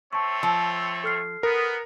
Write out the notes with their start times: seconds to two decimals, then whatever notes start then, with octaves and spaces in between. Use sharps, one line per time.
0.13 A3 C4 C#5 A5 C#6
0.43 F3 E6
1.04 A4 F6 C7
1.43 B3 A#4